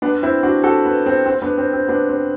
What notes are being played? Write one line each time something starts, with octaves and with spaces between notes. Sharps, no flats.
B3 D4
C4 E4
D4 F#4
F#4 A4
B3
C4
C4
B3 D4
C4
C4
B3 D4
C4